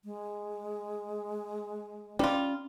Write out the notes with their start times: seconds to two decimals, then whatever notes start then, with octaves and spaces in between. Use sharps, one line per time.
0.05 G#3
2.19 G3 C#4 F4